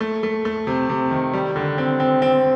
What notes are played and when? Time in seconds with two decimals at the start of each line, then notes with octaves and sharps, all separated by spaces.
0.01 A3
0.23 A3
0.45 A3
0.67 C3
0.89 C3
1.11 D#3
1.33 G3
1.56 D3
1.78 C4
2.00 C4
2.22 C4